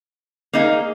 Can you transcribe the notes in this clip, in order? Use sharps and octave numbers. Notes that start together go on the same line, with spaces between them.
A#3 D#4 G#4